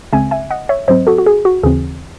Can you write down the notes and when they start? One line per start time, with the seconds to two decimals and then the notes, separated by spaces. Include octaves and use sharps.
0.13 C#2 C#3 G#3 C4 E5 G#5
0.31 E5 G#5
0.50 D#5 F#5
0.69 C#5 E5
0.88 G#2 F#3 C4 C5 D#5
1.07 F#4 A4
1.18 F#4
1.26 G#4
1.45 F#4
1.63 D#2 C#3 E3 C4 G#4